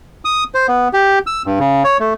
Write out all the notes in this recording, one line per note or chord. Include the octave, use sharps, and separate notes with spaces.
D#6
C5
B3
G4
E6
G2
C#3
C#5
A3